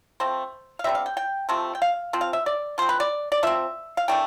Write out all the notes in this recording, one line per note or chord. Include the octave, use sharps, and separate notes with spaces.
F3 A3 C4 C5
F5
D3 G3 C4 E5
F5
G5
G5
C3 F3 A3 C4
G5
F5
F3 C4
F5
E5
D5
F3 C4 C5
B4
D5
D5
F3 C4 E5
F5
E3 A3 D4 G5